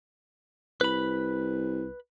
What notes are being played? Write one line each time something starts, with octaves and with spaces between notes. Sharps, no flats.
C2 B4 B5